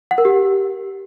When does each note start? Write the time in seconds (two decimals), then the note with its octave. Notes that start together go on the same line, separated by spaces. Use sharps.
0.11 F#5
0.18 A#4
0.25 G4